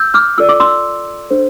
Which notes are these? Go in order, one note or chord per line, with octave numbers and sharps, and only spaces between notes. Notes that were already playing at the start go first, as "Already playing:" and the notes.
Already playing: E6 G6
D6 F6
F4 A4 D5 E6
D6
C6 E6
D4 A4 C5